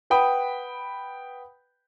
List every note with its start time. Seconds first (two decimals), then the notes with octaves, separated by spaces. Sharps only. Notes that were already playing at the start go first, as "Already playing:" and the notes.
0.10 B4 F#5 G5 B5 D#6